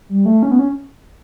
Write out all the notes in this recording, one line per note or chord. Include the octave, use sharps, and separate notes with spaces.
G3
A3
C#4
B3
C#4